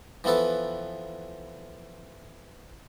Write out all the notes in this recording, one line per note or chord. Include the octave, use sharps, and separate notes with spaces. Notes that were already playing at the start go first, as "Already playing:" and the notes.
E3 F3 B3 A4 B4